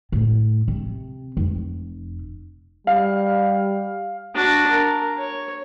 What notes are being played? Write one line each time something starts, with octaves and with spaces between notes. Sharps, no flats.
A2
C3
F1
G3 F5
D4 F#4
A#4
C#5